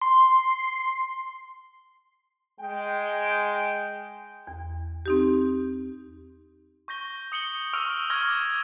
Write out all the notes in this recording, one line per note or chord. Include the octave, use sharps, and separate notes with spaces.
C6
G#3 G5
E2
C4 D#4 G4
C#6 G6 A#6 G7
D#6 C#7 F#7 G7
C#6 E6 F6 D7 F7
C#6 F6 G#6 A#6 G7
D6